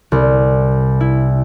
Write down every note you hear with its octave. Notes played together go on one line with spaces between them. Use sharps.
C2
E4